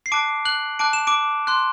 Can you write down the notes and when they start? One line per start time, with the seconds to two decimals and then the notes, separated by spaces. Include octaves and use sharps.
0.06 C7
0.12 A5 D6 F#6 D7
0.45 F#6 F#7
0.79 A5 D6 F#6 D7
0.93 E7
1.07 D6 D7
1.47 C6 F#6